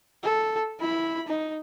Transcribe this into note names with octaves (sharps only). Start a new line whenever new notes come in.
A4
E4 B5
D#4